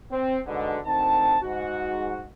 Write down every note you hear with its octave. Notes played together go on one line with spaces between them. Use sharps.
C4
G#2 B2 D3
D2 D#3 C4 A5
G#2 F#4